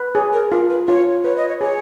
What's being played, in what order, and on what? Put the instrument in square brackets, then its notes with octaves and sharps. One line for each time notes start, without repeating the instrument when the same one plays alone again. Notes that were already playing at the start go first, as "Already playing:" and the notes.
Already playing: [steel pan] B4
[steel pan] G#4 [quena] C#5
[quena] A#4
[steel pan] F4 [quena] A#4
[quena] B4
[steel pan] F4 [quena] C#5
[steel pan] B4 [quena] C#5
[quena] D#5
C#5
[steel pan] G#4 [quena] C#5